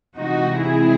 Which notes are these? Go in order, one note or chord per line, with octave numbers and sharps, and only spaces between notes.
C3 E3 G#3 C4 D#4 F#4
E4 G#4